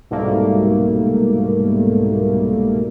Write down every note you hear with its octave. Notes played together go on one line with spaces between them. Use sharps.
C2 G#2 B2 G3 A3 A#3